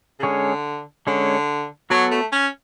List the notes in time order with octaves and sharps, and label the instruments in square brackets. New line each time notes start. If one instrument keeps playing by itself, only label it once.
[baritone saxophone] C#3
[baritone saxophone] D3 [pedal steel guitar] G#3 C#4 G#4 C#5
[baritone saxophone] D3 [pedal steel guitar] G#3 C#4 G#4 C#5
[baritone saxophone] F#3 [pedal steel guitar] B3 F#4 A4 C#5
[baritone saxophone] A3
C#4